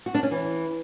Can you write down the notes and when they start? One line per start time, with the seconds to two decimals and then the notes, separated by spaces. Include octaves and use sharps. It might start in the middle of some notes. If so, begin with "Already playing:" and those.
0.06 F#4
0.15 D4
0.23 C#4
0.31 E3